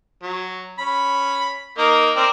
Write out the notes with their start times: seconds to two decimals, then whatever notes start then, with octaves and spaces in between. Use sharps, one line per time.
0.23 F#3
0.79 C#4 B5
1.78 A#3 D#4 A#4
2.16 C4 A#4 D5